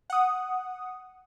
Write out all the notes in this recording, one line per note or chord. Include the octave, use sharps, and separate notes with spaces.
F#5 D#6